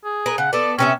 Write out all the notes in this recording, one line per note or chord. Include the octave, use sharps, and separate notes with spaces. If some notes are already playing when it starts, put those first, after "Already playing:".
G#4
A#4 B4
C#3 F#5
B3 A4 D5
C3 B3 C#4 E5